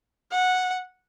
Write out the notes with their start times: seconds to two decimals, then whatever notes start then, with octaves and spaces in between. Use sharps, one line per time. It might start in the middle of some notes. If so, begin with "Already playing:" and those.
0.32 F#5